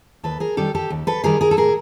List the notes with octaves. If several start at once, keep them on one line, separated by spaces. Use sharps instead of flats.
D#2 A4 B4
G#4 A#4
D#3 G3 G4 A4
G4 A4
D#2
A4 B4
D#3 G3 G#4 A#4
G#4 A#4
A4
A2 G#4 A#4